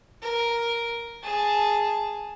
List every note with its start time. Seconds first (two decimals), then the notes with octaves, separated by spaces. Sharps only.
0.22 A#4
1.23 G#4 A5